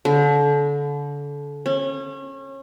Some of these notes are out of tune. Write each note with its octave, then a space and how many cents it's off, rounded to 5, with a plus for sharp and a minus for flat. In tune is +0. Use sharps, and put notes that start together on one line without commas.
D3 -30
C#4 -30